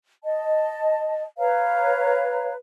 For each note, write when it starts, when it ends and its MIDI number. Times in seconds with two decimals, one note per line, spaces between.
0.24 1.25 75
0.24 1.25 81
1.39 2.53 71
1.39 2.53 73
1.39 2.53 77
1.39 2.53 82